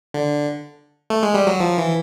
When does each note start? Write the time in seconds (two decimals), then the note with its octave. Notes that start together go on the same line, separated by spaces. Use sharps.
0.14 D3
1.10 A3
1.23 G#3
1.34 G3
1.47 F#3
1.60 F3
1.78 E3